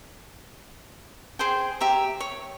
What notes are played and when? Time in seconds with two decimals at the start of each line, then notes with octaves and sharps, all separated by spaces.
1.39 G#4 C5 G5
1.81 G4 E5 A#5
2.20 C#5